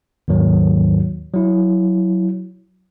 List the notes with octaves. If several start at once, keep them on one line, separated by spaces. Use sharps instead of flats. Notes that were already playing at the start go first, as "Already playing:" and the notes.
D#2 G#2 D#3 F#3
F#3 E4